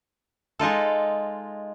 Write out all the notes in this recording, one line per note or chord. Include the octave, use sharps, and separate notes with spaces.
G#3 D#4 F4 A4